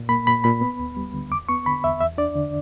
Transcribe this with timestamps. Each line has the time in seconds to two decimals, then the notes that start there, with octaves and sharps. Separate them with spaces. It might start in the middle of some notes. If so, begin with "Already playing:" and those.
Already playing: A#2
0.09 A#3 B5
0.27 A#2 B5
0.44 A#2 B5
0.61 B3
0.79 D2
0.97 G3
1.14 D3
1.31 E2 D6
1.49 B3 C#6
1.66 D3 B5
1.84 E2 E5
2.01 E2 E5
2.18 D4 D5
2.35 D3